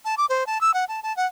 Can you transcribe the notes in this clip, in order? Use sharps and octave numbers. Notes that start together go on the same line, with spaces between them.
A5
D6
C5
A5
E6
F#5
A5
A5
F#5